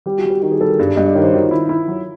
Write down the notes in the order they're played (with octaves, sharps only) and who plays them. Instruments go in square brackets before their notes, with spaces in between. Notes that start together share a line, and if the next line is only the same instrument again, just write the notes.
[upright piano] G3 [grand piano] G4
[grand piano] F#4
[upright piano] G3
[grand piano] G4
[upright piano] D#3 [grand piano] G4
[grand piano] G#4
[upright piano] G3 [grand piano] A4
[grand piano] A#4
[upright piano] G2
[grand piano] D5
[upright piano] G2 [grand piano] D#5
[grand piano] D5
[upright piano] D#3 [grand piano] C#5
[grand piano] C5
[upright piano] D#3 [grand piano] F#4
[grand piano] F4
[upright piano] E4
E4
F#3